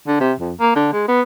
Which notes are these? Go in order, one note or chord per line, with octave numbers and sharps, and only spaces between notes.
D3
C3
F2
A#3
D3
G#3
B3